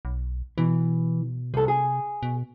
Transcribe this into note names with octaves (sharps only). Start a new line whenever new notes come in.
B1
B2 E3
C2 C3 A4
G#4
B2